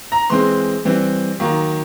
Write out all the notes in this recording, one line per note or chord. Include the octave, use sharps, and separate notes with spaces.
A#5
E3 G#3 C4 C6
E3 G3 C4
D#3 F#3 A#3